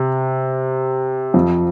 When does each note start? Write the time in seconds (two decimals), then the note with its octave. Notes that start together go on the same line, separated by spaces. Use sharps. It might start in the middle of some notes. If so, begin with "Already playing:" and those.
Already playing: C3
1.34 F2 F3